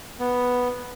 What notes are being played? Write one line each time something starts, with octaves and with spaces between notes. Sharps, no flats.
B3